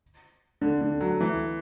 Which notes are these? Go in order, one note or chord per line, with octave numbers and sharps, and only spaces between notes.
D3
D3
F#3
E3